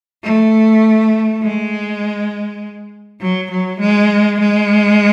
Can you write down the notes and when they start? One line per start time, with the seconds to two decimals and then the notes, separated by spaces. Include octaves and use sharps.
0.23 A3
1.42 G#3
3.21 F#3
3.51 F#3
3.80 G#3
4.40 G#3